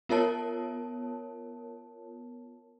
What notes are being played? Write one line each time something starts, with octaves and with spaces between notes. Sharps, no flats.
B3 F4 A#4 C#5 A5